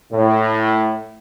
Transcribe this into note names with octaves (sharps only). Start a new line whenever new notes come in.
A2